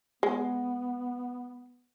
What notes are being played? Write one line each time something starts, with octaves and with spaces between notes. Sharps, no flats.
G#3 B3